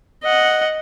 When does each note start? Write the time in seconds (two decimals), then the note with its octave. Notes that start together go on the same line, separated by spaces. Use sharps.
0.23 D#5 F#5